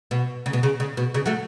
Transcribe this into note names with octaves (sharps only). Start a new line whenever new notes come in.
B2
C#3
B2
C#3
C#3
B2
C#3
F#3 A3